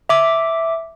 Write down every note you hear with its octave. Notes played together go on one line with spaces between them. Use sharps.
E5 D6